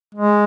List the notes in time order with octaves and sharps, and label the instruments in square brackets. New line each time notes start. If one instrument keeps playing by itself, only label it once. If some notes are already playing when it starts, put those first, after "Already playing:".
[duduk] G#3